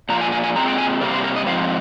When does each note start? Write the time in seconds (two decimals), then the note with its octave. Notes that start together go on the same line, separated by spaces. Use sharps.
0.09 A#2 F3 A#3 A#5
0.21 G#5
0.32 G#5
0.44 G#5
0.56 A#2 G#3 C4 A#5
0.68 G5
0.78 G#5
1.01 C3 G3 A#3
1.13 C5
1.24 A#4
1.36 D#5
1.46 G#2 F3 C4 F5